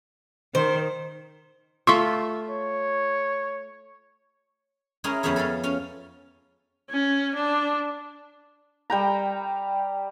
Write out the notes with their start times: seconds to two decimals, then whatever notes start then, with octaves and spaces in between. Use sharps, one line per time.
0.55 D#3 C5
1.87 A3 F4 E5 C6 C#6
2.49 C#5
5.04 G#3 C#4 E4 G#4 A#4 D#5
5.23 F2 F3 B3 C#4 G#4 E5
5.36 C#4 F4 G#4 A4
5.64 C#4 F4
6.90 C#4
7.35 D4
8.90 G3 G5 A#5